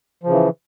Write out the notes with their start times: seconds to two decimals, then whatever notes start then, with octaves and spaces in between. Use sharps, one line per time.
0.23 F3
0.27 C#3
0.30 E3